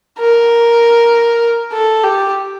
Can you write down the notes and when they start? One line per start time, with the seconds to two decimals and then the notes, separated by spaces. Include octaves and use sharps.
0.19 A#4
1.73 A4
2.04 G4